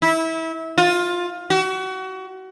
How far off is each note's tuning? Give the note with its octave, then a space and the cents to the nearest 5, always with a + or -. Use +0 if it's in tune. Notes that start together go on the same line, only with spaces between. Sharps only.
E4 -25
F4 +15
F#4 +30